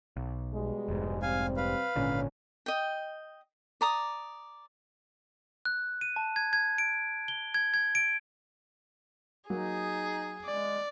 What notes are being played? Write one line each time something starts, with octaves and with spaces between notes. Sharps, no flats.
B1
B2 G3 G#3
F1 G#2
C3 G3 C4 F5 G#5
B4 F5
G#1 A#2 D3 C#4
D#5 G5
D5 A#5 D#6
F#6
D#7
A5
G#6
G#6
D7
G7
G#6
G#6
D7
F#3 A#3 D#4 G#4
G#3 D5